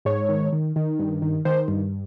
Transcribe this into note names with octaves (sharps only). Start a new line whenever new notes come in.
G#2 C#5
D#3
D#3
D#3
G2
D#3
D#3 C5
G2